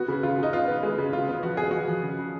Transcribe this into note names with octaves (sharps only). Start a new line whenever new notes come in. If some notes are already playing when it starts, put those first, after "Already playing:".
Already playing: B3 F#4
C#3
C#3 F4
C#3 D#4
B3 F4
B3
G#3
C#3
C#3 F4
B3
F3 F#4
B3 G#4
F3 F#4
F3
C#3
C#3